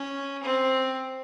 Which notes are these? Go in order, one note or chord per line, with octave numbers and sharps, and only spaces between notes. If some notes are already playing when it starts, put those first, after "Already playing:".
Already playing: C#4
C4